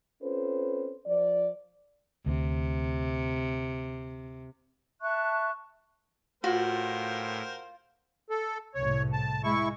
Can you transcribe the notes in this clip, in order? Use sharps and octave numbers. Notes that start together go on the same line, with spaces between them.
C4 C#4 F4 A4 B4 C5
F3 D5
D2 C3
E5 A5 C#6 F#6
A2 F4 F#4 A#4 C5 G5
A4
C2 A2 C#5
A5
G#3 E4 C#6